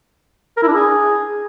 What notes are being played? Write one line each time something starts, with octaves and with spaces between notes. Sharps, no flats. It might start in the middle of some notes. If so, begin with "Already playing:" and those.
A#4
E4
D4
G#4